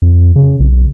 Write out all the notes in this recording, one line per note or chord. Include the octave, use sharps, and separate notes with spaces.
F2
C#3
B1